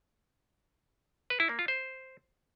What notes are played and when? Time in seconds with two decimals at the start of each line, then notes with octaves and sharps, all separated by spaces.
1.30 B4
1.40 E4
1.49 A#3
1.59 F4
1.68 C5